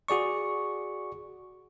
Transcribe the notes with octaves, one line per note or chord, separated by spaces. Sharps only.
F#4 G#4 D5 C#6